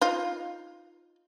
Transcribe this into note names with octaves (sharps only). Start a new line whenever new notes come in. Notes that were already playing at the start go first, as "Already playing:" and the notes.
D#4 F4